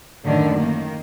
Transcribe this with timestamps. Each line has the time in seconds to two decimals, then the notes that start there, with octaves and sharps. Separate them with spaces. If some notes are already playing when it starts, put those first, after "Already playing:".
0.25 F#2 A2 D3 D#3
0.58 D#3 A#3